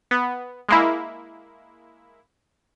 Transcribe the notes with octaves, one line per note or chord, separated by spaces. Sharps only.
B3
G#3 A#3 E4